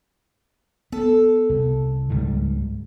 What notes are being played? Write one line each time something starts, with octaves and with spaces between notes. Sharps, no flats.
B3 A4
C2
C#2 G#2 G3